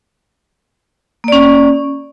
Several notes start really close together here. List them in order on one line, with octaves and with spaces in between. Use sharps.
A#3 D5 C#4